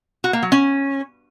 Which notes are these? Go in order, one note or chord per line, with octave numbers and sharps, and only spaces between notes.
F#4
A#3
F#3
C#4